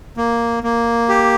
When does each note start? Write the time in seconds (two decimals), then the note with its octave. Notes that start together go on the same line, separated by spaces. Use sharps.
0.17 A#3
0.63 A#3
1.09 G4